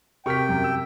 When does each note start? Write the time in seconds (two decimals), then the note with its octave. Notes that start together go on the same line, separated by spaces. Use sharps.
0.26 C3 G4 A#4 G5 C#6 F6 B6
0.49 F#2
0.64 E6